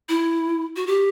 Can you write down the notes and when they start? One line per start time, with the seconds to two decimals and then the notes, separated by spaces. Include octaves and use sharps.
0.09 E4
0.76 F#4
0.87 G4